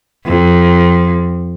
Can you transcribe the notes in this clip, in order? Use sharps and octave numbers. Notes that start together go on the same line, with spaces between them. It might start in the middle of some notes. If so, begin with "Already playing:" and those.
F2